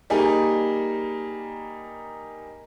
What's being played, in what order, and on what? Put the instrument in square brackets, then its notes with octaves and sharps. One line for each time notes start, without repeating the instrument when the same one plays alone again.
[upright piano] G3 A#3 D#4 G#4